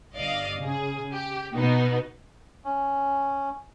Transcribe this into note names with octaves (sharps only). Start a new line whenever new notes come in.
G1 D5 D#5 F5
C#3 G#4
G4
B2 B3 D#4
C#4